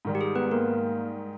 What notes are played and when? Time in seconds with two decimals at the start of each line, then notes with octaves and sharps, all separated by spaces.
0.05 G#2 D#3 G3
0.15 G4
0.21 G#4
0.35 B3 B4
0.51 A#3 A#4